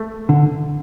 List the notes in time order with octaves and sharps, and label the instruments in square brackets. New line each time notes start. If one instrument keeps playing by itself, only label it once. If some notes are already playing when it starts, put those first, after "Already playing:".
Already playing: [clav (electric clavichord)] A3
[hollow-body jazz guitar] D3